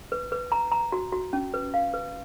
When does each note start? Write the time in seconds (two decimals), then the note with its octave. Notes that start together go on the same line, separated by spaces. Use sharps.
0.12 B4
0.32 B4
0.52 A#5
0.72 A#5
0.92 F#4
1.12 F#4
1.33 C#4
1.54 B4
1.74 F5
1.94 B4